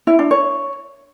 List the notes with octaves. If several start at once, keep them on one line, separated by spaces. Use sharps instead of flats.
E4
D4
C#5